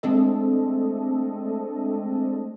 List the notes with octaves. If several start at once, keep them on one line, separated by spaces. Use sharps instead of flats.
G#3 A3 C4 D4 A4 D#5